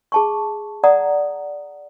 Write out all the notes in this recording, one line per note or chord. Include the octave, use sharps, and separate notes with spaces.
G#4 A5 C#6
D5 F#5 A#5 D#6